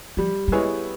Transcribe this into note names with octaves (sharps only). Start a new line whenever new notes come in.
F3 G3
G3
G#3 B3 E4 G#4 C#5